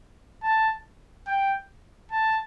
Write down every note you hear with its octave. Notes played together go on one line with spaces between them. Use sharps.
A5
G5
A5